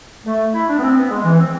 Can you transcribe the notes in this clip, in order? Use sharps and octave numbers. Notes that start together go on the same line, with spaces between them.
A3
E4
D4
B3
C4
B3
G#3
E3
C4